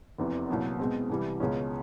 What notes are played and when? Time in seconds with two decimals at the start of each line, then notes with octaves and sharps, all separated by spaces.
0.18 F1 E2 C3 E3
0.49 C2 A#2 F#3 B3
0.79 B2 G#3 C4
1.09 C2 C3 E3 G3
1.40 C#2 B2 G#3 C#4